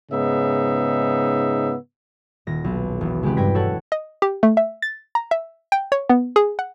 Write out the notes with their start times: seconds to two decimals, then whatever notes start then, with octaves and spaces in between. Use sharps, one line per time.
0.12 G#2 C#3 B3 D#4 E5
2.47 D#1 A#6
2.64 B1
3.01 E1
3.23 C#3 G#3 C4 G4 B4
3.37 G2 G5 G#6 A#6 B6
3.54 F#4 A4 C#5 F#5
3.92 D#5
4.22 G4
4.43 A3
4.57 E5
4.82 A6
5.15 A#5
5.31 E5
5.72 G5
5.92 C#5
6.09 B3
6.36 G#4
6.59 F#5